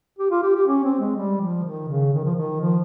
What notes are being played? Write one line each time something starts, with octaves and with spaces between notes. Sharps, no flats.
G4
F4
G4
G4
C#4
C4
G#3
G3
F3
D#3
C#3
D#3
F3
D#3
F3